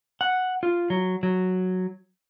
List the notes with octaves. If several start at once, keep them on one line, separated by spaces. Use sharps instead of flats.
F#5
F4
F#3
F#3